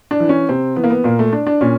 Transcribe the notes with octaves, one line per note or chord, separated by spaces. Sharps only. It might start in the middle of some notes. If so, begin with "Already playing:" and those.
D4
E3
C#4
C3 C4
E3 B3
A#3
B3
A#2 A#3
A3
D4
D4
A#2 C#4